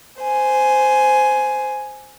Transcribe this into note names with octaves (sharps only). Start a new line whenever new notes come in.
C5 G#5